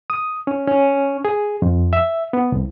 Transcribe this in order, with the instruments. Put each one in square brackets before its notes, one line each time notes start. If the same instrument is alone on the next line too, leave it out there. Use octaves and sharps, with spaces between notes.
[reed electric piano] D#6
C#4
C#4
G#4
F2
E5
B3
C2